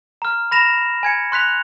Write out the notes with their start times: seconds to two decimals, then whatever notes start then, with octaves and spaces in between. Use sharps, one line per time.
0.22 A#5 F6
0.51 B5 A#6 E7 F7
1.03 G#5 G#6 C#7
1.32 C6 F#6 B6 F7